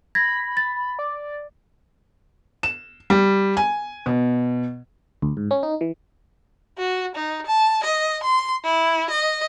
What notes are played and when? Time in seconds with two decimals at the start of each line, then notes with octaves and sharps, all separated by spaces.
0.15 B5 G#6 A#6
0.57 A6
0.99 D5
2.63 E7
3.10 G3
3.57 G#5
4.06 B2
5.22 D2
5.37 G#2
5.51 C#4
5.63 D#4
5.81 E3
6.78 F#4
7.15 D#4
7.47 A5
7.84 D#5
8.23 C6
8.64 E4
9.10 D#5